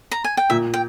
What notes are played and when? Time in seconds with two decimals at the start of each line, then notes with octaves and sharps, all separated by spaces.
0.11 A#5
0.24 G#5
0.37 G5
0.50 A#2 E5
0.74 G5